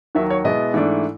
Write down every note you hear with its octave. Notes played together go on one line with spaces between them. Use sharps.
D#2 D#3 F#3 A#3 E5
C#5
B2 G#3 B3 E4 D#5
G#2 E3 A3 D4